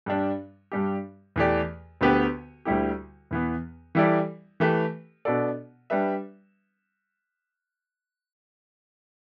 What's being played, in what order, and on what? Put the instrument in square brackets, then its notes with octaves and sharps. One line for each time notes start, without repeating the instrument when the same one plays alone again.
[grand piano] G2 G3 D4
G2 G3 D4 G4
E2 E3 A3 G4 D5
D2 D3 B3 G4 B4
D2 D3 G3 E4 G4
E2 E3 B3
E3 G3 E4 A4 D5
E3 A3 G4 B4
B2 B3 D4 A4 D5
G3 D4 B4 E5